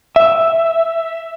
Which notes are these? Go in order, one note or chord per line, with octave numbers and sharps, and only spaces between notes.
E5